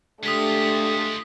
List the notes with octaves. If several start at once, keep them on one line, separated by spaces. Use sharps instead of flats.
G#3 A3 D4 F4 G4 D#6 B6 C7